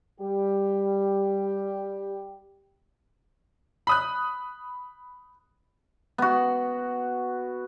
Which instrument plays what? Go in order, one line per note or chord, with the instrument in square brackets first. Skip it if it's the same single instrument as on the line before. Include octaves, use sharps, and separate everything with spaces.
[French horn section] G3 G4
[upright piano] B5 D#6 F#6
[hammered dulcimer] B3 F#4